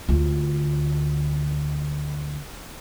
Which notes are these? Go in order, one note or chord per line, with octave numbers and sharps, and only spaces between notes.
D2 F4